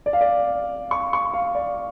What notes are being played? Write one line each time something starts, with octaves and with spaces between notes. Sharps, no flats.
D5
F5
D5
C#6
C#6
F5
D5